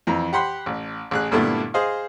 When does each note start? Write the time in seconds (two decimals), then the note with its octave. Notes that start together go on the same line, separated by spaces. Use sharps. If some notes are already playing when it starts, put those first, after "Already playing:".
0.07 F2 E3 A#5
0.33 G4 F#5 B5 C6
0.66 A1
1.11 A1 G#4 F#6
1.32 G2 A#2 D3 A3 B3 E4
1.74 G#4 C5 D#5 F5